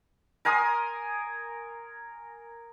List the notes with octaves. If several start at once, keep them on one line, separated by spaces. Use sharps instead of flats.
A#4 G#5 C6 D#6